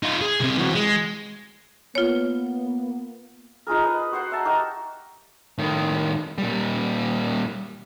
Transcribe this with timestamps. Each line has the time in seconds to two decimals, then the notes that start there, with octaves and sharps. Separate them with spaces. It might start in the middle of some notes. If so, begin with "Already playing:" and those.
0.03 D#4 F4
0.21 G#4
0.40 C2 C3
0.58 E3 F#4
0.75 G#3
1.95 A#3 B3 F4 C#5
3.67 D#4 F4 G#4 A#4
3.83 B4 D#5
4.12 F#4 C5 F#5 C6
4.32 E5 A5 A#5
4.45 D#4 F#4 G4 A#4
5.58 A2 D#3
6.38 A#2 G3